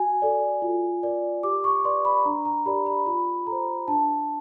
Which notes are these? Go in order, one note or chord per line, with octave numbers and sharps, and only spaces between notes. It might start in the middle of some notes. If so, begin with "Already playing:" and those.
Already playing: F#4 G#5
A4 D5
F4
A#4 D5
G4 D6
C#6
B4 D5 C6
B5
D4 A#5
A#5
G4 A#4 D5 B5
B5
F4 B5
A4 A#5
C5
D4 A5